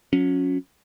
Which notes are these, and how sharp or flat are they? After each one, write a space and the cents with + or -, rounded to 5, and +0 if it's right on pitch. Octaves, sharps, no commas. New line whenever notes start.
F#3 -40 C#4 +0